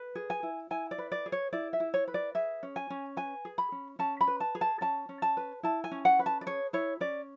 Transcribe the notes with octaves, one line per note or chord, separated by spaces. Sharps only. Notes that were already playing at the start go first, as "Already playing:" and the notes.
Already playing: B4
G#4
G#5
E4
E4 G#5
D5
B4
D5
G#4
C#5
E4 D5
E5
E4
C#5
B4
D5
G#4 E5
C#4
G#5
C#4
B4 G#5
G#4
B5
C#4
C#4 A5
B5
B4
A5
G#4
A5
C#4 A5
C#4
A5
B4
E4 A5
G#5
C#4
F#5
B4
A5
D5
G#4 C#5
E4 C#5
C#4 D5